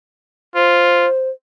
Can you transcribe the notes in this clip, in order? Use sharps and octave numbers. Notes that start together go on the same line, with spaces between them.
F4 C5